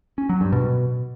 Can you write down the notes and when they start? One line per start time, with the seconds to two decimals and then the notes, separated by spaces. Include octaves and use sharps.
0.18 C#4
0.29 F#3
0.41 G2
0.52 B2